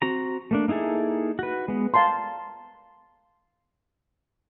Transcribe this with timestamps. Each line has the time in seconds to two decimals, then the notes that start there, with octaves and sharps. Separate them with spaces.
0.02 C4 F#4 A#5
0.51 A3 A#3 D4
0.68 A#3 D#4 E4 G#4 A4
1.39 F#4 B4
1.68 G#3 B3
1.94 F5 A5 A#5 C6